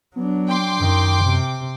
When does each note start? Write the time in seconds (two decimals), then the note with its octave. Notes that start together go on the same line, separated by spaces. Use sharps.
0.16 F#3 B3 D4
0.48 G5 C6 D6
0.80 F#2 D#3
1.23 C3